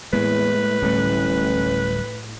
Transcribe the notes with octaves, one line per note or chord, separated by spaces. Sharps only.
E2 A2 G#3 A#3 B4
D1 A1 G3 A3